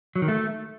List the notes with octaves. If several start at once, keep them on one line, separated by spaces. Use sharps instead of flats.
F#3
D#3
A3